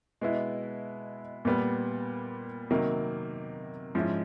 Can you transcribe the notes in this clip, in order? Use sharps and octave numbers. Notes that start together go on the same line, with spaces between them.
B2 G#3 B3 E4
A#2 G3 B3
C3 D#3 F#3 A#3
G#2 F3 G#3 C#4 E4